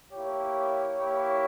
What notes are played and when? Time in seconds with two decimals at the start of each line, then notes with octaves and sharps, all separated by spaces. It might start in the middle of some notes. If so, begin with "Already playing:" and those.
0.13 A#3 E4 G4 C#5
1.00 A#3 E4 G4